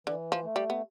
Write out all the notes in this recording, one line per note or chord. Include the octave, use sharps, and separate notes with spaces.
D3 E3
F3
A3
G3
B3